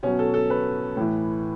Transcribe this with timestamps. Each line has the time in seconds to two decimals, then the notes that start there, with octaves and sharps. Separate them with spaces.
0.03 B2 F#3 C#4
0.19 A4
0.34 A4
0.50 B4
0.97 A2 E3